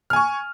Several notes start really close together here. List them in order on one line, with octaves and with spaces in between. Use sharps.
F6 G#5 C#6